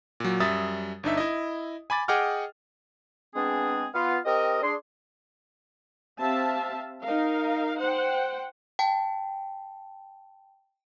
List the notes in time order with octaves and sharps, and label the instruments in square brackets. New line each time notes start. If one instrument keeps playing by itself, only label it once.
[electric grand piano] A#2 F#3
F#2 G3 E5 D#6 A6
G1 D4 D#4 E5
E4 D#5
G#5 B5 D6 A6
G#4 D#5 F#5 G5 D6 F6
[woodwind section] G#3 B3 C4 D4 G#4
B3 F4 F5
C4 G4 A#4 D#5
D4 G#4 C6
[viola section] C4 G4 E5 F5 A5
D#4 A#4 F5
C5 F#5 G5
[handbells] G5 A5